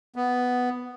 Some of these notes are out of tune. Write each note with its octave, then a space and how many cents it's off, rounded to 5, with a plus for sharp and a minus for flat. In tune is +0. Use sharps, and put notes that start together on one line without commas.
B3 +5